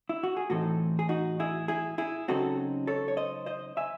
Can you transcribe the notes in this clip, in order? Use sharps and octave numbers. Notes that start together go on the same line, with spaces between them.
E4
F#4
G#4
A2 E3 C4 D#4 F#4 A4
G#4
D#4 F#4
E4 G#4
E4 G#4
E4 G#4
C#3 F#3 C4 D#4 F#4 A4
A4 C#5
C#5
C5 D#5
C5 D#5
E5 G#5